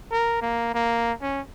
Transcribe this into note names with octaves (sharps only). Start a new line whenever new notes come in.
A#4
A#3
A#3
C#4